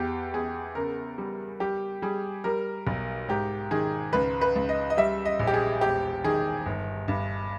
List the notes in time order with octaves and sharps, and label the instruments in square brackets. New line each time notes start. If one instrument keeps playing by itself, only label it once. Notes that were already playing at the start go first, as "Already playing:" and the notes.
Already playing: [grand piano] E2 G4
E2 G#4
C#3 A#4
G3
G3 G4
G3 G#4
G3 A#4
B1
G#2 G4
D#3 G#4
C#2 B4
B4
C#2
D#5
D#5
G3 E5
D#5
A#1
G4
G#4
E1 G4
D#3 G#4
G1
G2